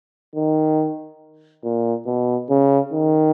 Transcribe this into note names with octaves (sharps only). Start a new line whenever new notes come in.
D#3
A#2
B2
C#3
D#3